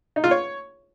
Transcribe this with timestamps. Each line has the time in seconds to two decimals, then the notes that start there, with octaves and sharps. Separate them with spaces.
0.16 D#4
0.24 F4
0.31 C#5